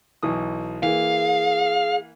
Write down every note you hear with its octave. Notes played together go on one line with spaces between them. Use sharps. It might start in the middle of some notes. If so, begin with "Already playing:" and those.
B1 E3 D#6
E3 A#3 G#4 F5